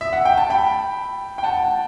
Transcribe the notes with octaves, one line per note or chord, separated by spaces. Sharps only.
E5
F#5
G5
A5
G5 B5
G5
F#5 A5